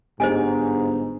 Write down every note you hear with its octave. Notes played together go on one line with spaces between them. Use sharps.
G1 G#2 G3 G#3 C5 D#5 G#5